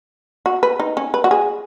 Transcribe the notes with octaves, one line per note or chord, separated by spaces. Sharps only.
F#4
B4
D#4
C#4
B4
F#4
G#4